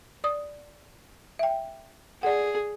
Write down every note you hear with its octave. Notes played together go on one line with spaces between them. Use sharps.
D5 D#6
E5 G5
G#4 D5 F#5